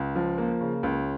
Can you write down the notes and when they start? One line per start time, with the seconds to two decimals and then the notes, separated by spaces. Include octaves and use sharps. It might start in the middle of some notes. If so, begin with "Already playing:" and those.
Already playing: C#2
0.15 F3
0.38 A#3
0.61 C#3
0.83 C#2